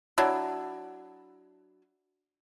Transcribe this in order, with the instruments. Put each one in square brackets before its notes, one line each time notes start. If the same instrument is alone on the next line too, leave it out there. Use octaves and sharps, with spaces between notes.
[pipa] F#3 D4 E4